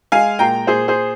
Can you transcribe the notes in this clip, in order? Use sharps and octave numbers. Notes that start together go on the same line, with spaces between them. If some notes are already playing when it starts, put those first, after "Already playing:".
G#3 F5 G#5
A#2 G5 A#5
A#2 G#4 C5
G#4 C5